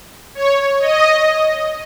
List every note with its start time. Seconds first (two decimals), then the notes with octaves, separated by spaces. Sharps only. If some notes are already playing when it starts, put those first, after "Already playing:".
0.35 C#5
0.79 D#5